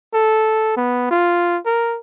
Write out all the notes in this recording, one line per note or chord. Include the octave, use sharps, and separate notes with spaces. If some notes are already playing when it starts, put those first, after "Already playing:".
A4
B3
F4
A#4